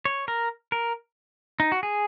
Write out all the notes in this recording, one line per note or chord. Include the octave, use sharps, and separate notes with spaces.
C#5
A#4
A#4
D#4
F#4
G#4